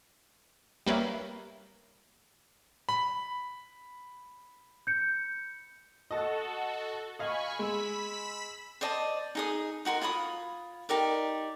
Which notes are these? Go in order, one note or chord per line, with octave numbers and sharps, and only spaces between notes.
G3 A#3 B4 C#5 E5
B5
G6 C#7
F#4 A4 D#5 A5
D#5 F5 G#5 B5 C#6
G#3 B5 E6 B6
C5 D5 D#5 A5
D#4 G#4 D#6
D#4 F#4 A#4 C6
F4 C#5 B5 D#6
D#4 G4 A#4 D5